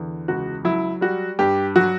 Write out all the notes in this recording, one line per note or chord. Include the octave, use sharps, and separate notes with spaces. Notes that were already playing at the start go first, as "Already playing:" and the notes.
Already playing: E2 D3
C#2 F#4
F#3 E4
G3 F#4
G2 G4
F#3 F#4